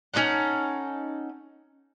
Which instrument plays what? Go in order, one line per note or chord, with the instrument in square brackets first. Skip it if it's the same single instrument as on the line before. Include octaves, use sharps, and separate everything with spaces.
[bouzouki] C#4 D#4 A4 F#5